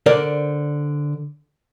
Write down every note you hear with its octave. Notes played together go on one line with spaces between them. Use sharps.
D3 A#4 C5 D5